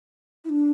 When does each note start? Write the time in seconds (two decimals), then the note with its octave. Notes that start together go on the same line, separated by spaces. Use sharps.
0.44 E4
0.49 D4